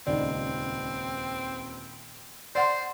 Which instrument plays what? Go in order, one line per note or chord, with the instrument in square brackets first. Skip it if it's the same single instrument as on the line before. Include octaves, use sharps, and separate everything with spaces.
[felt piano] D#1 C#2 D#4 [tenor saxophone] C4 [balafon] D5
[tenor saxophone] C5 [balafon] D5 F#5 C6 [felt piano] A6